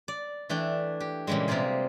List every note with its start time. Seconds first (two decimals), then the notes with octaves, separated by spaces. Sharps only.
0.08 D5
0.49 E3 A3 D4 G5
1.00 G4
1.27 A#2 C#3 E3 G3 G#3
1.48 C3 G3 A#3 F4 G#4